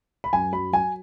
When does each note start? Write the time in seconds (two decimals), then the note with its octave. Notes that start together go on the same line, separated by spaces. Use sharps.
0.24 B5
0.33 F#2 G#5
0.53 F#3 B5
0.73 F#3 G#5